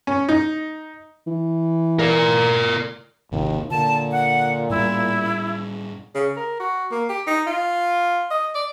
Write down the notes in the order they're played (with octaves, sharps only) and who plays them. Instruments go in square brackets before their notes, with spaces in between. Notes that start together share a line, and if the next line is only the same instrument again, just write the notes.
[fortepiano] C#4
D#4
[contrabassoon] E3
[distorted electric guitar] A#4 D5
[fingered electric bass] G#1 C3 D#3 [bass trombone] D#2
[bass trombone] A#2 [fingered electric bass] D3 [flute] A5
[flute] F#5
[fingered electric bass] A2 G3 [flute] E4
[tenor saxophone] C#3
A#4
F#4
A#3
G4
D#4
F4
D#5
D5